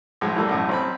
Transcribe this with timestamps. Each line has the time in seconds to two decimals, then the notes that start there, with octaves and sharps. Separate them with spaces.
0.21 B1 A2 F3 G#3
0.36 E3 G3 A3 A#3
0.49 B1 F#2 A2
0.69 A1 C4 B5